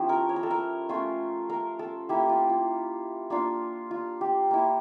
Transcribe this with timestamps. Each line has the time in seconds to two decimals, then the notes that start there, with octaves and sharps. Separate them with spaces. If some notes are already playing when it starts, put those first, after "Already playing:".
Already playing: F3 C#4 E4 G4
0.09 A#4
0.29 C#5
0.36 A#4
0.43 A4
0.51 A#4
0.89 A3 C#4 F4
1.50 A#4
1.79 A4
2.09 A#3 E4 G4
2.29 F4
2.50 F4
3.30 A#3 D4 F4
3.91 F4
4.21 G4
4.51 A#3 E4